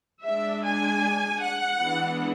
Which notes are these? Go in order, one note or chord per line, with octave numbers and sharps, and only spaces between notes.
G#3 D4 E5
G#5
F#5
E3 G#3 B3 D4